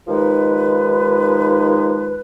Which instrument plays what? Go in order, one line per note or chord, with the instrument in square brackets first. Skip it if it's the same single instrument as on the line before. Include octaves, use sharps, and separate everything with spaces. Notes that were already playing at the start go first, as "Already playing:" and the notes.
[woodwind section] D#2 F3 G#3 D#4 B4